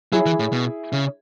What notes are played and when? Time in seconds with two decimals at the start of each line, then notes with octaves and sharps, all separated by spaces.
0.12 F#3 E4 G#4
0.26 E3
0.39 A2
0.52 B2
0.93 C#3